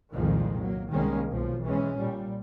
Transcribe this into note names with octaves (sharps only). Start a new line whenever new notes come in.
C2 F2 A#2 D#3 F3 G#3
F#3 A#3
C2 D#3 G3 G#3 A#3 C#4
B1 F3
E3 G#3 C#4
A#2 G3